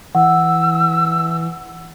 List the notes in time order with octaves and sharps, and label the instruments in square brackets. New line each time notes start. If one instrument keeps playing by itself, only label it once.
[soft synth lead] E3 [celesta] F#5 [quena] E6